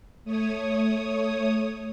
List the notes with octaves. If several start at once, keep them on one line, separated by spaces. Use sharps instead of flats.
A3 C#5 D#6